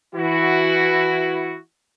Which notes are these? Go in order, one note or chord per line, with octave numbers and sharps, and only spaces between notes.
E3 E4 F#4